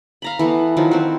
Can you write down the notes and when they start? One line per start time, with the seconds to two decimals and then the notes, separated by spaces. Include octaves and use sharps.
0.22 F5 A#5 B5
0.39 E3 A3 B3
0.77 D#3 F3 F#3 E4
0.91 C4 F#4